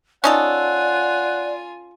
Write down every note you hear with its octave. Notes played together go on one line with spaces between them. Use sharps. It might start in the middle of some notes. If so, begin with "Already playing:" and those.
C#4 D#4 F4 A4 D5 F#5 G#5